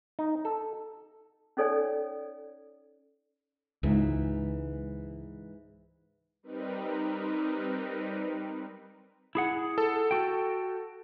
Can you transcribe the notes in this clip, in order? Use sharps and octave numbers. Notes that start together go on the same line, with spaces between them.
D#4
A4
C#4 D#4 A4 C#5 D5 G#5
C#2 G#2 E3
G3 C4 D#4 A#4 B4
E4 G#4 F#5
A4
F#4 G5